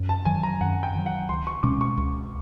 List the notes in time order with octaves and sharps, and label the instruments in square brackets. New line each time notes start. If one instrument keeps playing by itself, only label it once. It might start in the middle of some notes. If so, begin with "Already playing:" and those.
Already playing: [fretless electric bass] F#2
[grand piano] A5
[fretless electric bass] D#3 F#3 [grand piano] G#5
[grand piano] A#5
[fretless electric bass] F#2 [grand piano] F#5
[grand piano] G5
[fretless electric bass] D#3 F#3
[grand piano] F#5
[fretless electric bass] C#2 [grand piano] C6
[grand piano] C#6
[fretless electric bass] B2 G#3 C#4 [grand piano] D6
[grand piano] C#6
[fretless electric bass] C#2